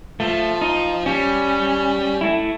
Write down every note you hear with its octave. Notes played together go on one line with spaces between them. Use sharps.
F3 A3
D#4
G3 C#4
A3 E4